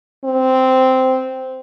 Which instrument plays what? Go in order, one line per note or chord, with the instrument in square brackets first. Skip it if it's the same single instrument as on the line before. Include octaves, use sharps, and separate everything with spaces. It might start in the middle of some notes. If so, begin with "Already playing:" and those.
[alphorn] C4